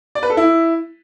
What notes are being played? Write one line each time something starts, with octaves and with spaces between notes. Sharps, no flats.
D5
B4
A4
E4